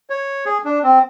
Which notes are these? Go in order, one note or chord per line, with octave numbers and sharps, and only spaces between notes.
C#5
G#4
D4
C4